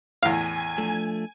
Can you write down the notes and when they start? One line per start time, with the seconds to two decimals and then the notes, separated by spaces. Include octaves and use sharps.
0.23 E2 A2 F5 G#5
0.78 F3 A3 D4